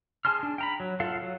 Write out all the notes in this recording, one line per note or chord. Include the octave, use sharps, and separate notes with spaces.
G#4 G#5 A5 C6 F6
D4
G5 A#5 B5
F#3
F4 A4 F5 F#5
F#3